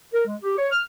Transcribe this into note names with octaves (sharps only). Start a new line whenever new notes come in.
A#4
G#3
G4
C#5
F6